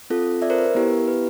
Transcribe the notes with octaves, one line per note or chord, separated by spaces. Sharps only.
C4 F4 A4
D5 E5
A#4 C5
B4
A#4
B3 E4 G4
B4